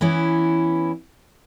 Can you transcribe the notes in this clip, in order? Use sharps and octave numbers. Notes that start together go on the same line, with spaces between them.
E3 B3 C#4 E4